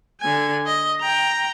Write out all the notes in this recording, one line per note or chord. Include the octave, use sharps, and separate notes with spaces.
D3 G#5
D#5
G5 A#5